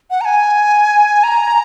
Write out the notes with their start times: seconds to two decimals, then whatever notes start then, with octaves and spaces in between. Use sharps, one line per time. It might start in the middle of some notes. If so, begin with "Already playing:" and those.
0.10 F#5
0.21 A#5
0.25 G#5
1.24 A#5